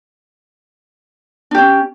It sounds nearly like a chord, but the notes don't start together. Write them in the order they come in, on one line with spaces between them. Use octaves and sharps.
D4 G4 C#4